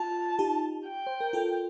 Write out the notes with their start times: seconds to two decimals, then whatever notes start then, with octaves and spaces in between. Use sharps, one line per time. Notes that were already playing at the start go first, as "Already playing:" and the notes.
Already playing: F4 A5
0.39 D#4 G4
0.87 G5
1.07 C5
1.21 A#4
1.33 F4 A4